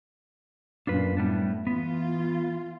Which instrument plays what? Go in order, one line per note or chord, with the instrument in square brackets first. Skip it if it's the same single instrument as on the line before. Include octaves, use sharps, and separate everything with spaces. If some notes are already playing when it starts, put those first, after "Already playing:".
[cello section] F#2 A#2 [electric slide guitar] D4 F4 B4
[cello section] A2 [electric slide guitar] G3 B3 D4
[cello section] E3 F4 [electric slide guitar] B3